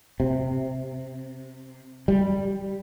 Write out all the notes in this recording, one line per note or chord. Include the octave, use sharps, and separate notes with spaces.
C3
G3